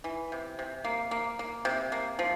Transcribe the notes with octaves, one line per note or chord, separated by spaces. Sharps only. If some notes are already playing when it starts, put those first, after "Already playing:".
E3
C3
C3
A#3
A#3
A#3
C3
A#3
F3